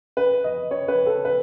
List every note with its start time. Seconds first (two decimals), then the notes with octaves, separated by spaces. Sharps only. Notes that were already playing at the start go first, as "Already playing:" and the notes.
0.17 B4
0.44 D#5
0.71 C#5
0.88 B4
1.06 A4
1.25 B4